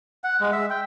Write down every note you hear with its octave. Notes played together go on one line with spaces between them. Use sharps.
F#5
G#3
E5
G5